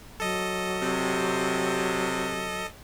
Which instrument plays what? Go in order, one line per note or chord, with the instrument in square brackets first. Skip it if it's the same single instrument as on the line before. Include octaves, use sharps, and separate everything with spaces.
[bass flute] F#3 [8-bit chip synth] A4 D#5
[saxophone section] C3